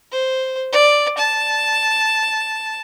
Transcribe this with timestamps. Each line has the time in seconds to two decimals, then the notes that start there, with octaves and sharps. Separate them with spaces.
0.12 C5
0.72 D5
1.18 A5